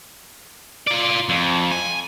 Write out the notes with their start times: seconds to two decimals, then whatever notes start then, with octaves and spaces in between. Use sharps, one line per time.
0.87 F4 D5
1.29 F2
1.71 G#5